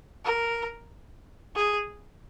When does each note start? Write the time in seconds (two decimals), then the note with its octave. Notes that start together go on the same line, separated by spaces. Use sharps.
0.25 A#4
1.55 G#4